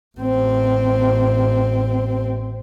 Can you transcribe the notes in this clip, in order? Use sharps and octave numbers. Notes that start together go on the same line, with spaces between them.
A1 C4